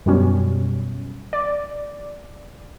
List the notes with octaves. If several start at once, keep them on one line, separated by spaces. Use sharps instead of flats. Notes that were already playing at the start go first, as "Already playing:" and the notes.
F#2 B2 G3 C#4
D5